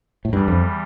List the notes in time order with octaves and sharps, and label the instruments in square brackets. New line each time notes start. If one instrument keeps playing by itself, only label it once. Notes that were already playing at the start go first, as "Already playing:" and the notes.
[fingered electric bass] A2
[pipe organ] E2 E3 G3 [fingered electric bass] G2
[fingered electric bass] F2